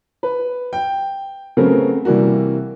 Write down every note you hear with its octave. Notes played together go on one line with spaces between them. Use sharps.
B4
G5
C#3 F#3 A3 B3 C4 A#4
C3 E3 G3 A#3 F#4